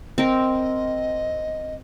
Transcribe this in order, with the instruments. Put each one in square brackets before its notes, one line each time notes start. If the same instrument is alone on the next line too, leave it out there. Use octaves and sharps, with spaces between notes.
[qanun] C4 A#4 [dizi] D#5